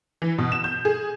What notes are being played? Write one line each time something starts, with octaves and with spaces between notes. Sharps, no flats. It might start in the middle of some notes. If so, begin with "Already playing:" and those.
E3
B2
E7
G6
G#4